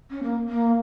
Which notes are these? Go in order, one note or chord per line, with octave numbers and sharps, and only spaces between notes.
C#4
A#3
A#3